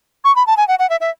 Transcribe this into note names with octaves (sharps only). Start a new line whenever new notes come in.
C#6
B5
A5
G#5
F#5
F#5
E5
E5